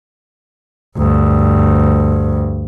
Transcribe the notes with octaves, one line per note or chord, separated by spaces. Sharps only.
D2 G2